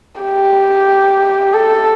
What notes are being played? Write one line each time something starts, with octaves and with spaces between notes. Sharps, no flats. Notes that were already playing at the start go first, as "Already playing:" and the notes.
G4
A4